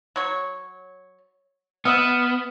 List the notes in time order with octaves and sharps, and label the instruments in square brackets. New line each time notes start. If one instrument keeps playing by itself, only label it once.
[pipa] F#3 C#5
[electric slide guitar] B3 [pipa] D#5 E5 F#5 [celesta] F6 E7